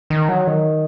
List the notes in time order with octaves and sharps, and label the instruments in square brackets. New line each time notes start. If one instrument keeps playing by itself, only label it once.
[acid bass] D#3
F#3
D#3